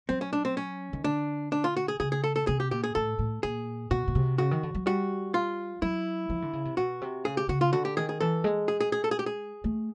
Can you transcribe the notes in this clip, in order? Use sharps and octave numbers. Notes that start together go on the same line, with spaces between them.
F#3 C4
C#4
D4
C4
C#4
D#3
D3 D4
D4
F4
F#4
G#4
C#3 G#4
G#4
A4
A4
C3 G#4
G4
A#2 G4
G#4
A2 A4
A2
A#2 G#4
B2 F#4
B2
C3
C#3 F#4
D#3
D3
F#3
G3 F#4
F4
F#3 E4
F3
D3
C#3
C3
B2 F#4
C3
C#3 G#4
G4
C#3 F#4
F4
D3 F#4
G4
D#3 G#4
G#4
E3 A4
G#3
G#4
G#4
G#4
A4
G#4
G4
G#4
A3